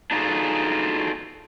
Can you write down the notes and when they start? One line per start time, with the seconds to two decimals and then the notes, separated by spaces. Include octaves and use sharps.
0.11 D4 D#4 F4 F#4 G#4 A4